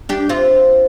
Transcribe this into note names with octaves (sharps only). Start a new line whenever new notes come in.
D4 G4
C4 F4